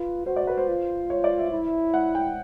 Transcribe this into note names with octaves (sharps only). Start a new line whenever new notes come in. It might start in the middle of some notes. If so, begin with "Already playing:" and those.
Already playing: F4 B4
F#4 C5
D5
B4
C5
F4
C#5
D5
E5
E4
F#5
G5